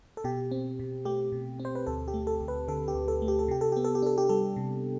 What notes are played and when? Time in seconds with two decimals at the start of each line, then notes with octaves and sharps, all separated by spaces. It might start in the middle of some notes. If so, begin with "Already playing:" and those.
0.17 A4
0.24 B2 G4
0.51 C4
0.79 B2
1.05 A3 G4
1.32 B2
1.60 C4
1.65 C5
1.75 B4
1.87 D2 A4
2.08 G4
2.14 A3
2.27 A4
2.40 D2
2.48 B4
2.68 D3 A4
2.88 G4
2.95 D2
3.08 A4
3.22 A3
3.28 G4
3.39 A4
3.48 C3 G4
3.61 A4
3.72 B3 G4
3.84 A4
3.95 G4
4.02 D4 A4
4.18 G4
4.29 G3 A4
4.56 C3